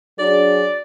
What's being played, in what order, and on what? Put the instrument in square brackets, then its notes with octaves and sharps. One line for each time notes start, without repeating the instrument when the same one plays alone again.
[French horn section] F#3 D4 G#4 [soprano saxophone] D5